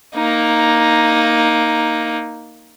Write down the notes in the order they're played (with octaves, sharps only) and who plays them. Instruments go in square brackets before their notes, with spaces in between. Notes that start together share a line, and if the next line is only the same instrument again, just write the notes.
[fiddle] A#3 D#4